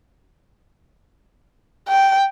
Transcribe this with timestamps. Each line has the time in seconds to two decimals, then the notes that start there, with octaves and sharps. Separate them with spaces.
1.88 G5